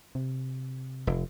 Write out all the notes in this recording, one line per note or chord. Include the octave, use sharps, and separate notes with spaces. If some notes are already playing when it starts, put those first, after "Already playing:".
C3
F1